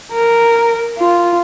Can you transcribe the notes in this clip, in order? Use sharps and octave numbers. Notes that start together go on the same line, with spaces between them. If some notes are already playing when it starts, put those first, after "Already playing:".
A#4
F4